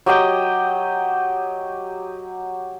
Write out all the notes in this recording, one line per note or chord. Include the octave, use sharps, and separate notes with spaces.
F#3 G4 D#5 G5